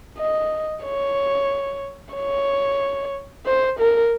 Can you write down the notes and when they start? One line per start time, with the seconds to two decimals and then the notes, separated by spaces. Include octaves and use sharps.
0.18 D#5
0.84 C#5
2.14 C#5
3.46 C5
3.79 A#4